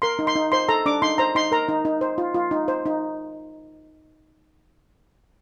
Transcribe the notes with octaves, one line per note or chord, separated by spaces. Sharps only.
A#4 C6
D#4
C6
D#4
C5 C6
A4 A#5
D4 D6
D#4 C6
C5 A#5
D#4 C6
A#4 A#5
D#4
D#4
C5
F4
F4
D#4
C5
D#4